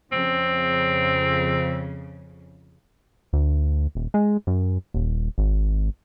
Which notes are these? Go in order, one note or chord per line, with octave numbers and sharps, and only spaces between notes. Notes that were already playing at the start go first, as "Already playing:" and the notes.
F2 C#3 C4
D2
D#1
G#3
F#2
D#1
G#1